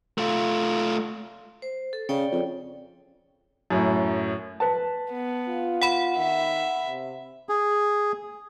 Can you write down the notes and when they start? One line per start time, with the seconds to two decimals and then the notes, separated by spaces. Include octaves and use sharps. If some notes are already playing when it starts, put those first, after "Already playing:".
0.18 A3 F4
1.62 C5
1.93 A4
2.09 C#3 C#5 D5 G5
2.32 F2
3.70 F#2 A2
4.60 B4 A5
5.12 B3
5.48 F4
5.82 F#5 B5
6.17 D#3 E5
6.87 C3
7.49 G#4